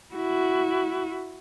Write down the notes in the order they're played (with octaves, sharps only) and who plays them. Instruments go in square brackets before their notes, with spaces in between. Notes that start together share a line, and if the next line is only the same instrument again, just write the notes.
[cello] E4 F#4